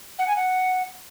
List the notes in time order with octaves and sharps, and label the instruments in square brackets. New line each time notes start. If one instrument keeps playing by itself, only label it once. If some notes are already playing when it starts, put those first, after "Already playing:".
[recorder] F#5
G#5
F#5